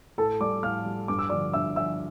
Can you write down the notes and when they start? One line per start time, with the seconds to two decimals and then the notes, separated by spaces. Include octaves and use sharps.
0.18 A2 A4 A5
0.41 G3 D5 D6
0.63 A2 F5 F6
0.86 G3
1.08 G2 D6
1.19 E6
1.29 D3 F3 D5 D6
1.54 G2 E5 E6
1.76 D3 F3 E5 E6